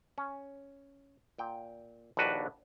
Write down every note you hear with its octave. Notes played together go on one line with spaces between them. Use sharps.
C#4
A#2 G5
A#1 D#2 D4 F#4 B4